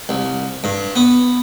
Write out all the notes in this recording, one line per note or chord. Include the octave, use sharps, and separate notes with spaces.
C2
G2
B3